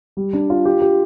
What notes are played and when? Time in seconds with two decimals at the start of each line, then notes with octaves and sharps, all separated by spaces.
0.17 G3
0.33 D4
0.50 F4
0.65 G4
0.82 G4